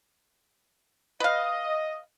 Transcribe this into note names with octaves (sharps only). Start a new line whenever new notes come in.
B4 D#5 F5